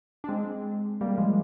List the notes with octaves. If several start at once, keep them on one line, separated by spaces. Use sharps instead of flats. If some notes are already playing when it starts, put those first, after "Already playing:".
D4
G#3 C4
G3 A#3
F3 G#3